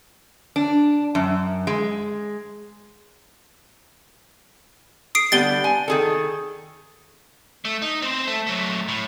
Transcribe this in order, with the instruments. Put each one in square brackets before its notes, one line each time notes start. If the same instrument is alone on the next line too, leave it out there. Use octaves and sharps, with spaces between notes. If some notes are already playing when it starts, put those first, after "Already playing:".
[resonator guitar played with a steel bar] D4
F#2
G#3
[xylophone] D#6 C7 D7
[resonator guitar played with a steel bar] D3 G3 B3 [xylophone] A6 D7 G7
[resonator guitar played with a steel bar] G#5
D#3 G#4 A4
[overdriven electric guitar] A3
D#4
C4 C5
A3
F#3 A3
A2